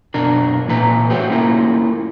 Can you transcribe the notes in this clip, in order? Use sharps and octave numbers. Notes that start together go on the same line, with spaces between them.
F#2 B2 D4 A#4
A#2 E3 A3 B4 A#5
F#4 G#4 C5 C#5 E5 G5
A3 A#3 C#4 E4 F4 A#4